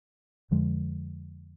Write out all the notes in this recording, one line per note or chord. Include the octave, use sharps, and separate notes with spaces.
F2 D3 F3 G#3